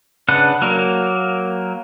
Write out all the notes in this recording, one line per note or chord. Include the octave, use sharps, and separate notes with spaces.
C#3 D4 B4 F#5
F#3 A#3 A#4